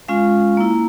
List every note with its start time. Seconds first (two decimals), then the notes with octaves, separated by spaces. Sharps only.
0.08 G#3 C#4 F4 F5
0.57 A#3 E4